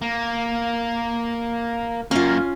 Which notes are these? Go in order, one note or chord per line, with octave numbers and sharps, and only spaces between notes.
A#3
F#2 A#3 C#4 F4